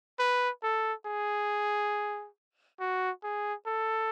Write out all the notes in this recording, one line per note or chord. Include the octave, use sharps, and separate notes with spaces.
B4
A4
G#4
F#4
G#4
A4